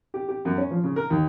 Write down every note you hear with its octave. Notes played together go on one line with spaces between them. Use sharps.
G4
G4
F#2
C#4
F3
C#3
A#4
D#2